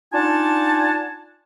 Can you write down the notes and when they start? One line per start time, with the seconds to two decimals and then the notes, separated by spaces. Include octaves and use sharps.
0.13 D4 D#4 F4 F#5 G#5 A5